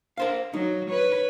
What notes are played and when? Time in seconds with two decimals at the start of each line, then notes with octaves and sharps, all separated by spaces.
0.17 A#4 C5 F5
0.53 F#3 D#4
0.89 B4 C#5